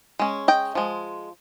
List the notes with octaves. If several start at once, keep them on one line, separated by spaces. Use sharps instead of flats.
G#3 C#4
D#5 G5
F3 G#3